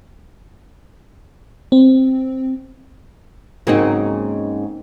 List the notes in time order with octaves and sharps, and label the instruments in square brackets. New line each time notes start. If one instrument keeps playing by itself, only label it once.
[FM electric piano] C4
[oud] G#2 C#3 A#3 [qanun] F#3 C4 D#4